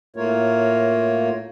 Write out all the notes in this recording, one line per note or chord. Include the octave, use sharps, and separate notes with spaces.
A2 A3 A#3 F4 A#4 C#5